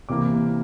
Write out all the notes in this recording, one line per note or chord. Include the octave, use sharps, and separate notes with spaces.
C3 E3 A#3 D6